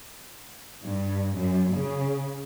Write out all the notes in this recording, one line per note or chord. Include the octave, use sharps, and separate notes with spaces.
G2
F#2
C#3